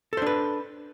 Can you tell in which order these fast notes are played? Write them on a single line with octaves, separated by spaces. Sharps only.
A4 C5 D4 B4